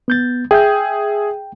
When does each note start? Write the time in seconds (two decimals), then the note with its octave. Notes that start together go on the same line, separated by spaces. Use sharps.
0.08 B3 G6 A6
0.51 G#4 E5 G5 G6